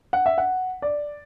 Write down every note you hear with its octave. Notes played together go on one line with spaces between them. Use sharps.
F#5
E5
F#5
D5